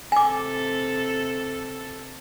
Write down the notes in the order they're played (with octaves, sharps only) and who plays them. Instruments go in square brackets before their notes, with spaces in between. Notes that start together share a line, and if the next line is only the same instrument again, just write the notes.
[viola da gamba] C3 A4 [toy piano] G#5 D6